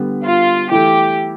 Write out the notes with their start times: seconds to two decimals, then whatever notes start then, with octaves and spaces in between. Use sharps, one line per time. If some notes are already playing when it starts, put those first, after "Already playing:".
Already playing: D3 G3 B3
0.24 F4
0.71 E3 A3 E4 G4 A4